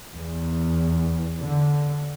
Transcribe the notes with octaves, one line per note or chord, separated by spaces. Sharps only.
E2
D3